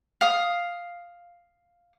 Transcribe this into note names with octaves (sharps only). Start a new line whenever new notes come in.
F5 D#6